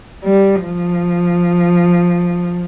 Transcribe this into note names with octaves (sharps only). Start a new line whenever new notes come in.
G3
F3